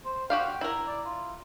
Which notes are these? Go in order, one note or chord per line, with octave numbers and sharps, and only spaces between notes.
C5
F#4 G4 F5 G5
E4 A#4
D5
F4